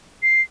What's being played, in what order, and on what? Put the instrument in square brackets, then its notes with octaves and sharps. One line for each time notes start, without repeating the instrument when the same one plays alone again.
[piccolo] C7